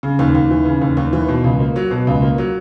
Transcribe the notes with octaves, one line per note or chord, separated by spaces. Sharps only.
C#3
D#2
D#2
E3
C#3
D#2
D#2
E3
B2
C#2
A#3
F#3
B2
C#2
A#3
F#3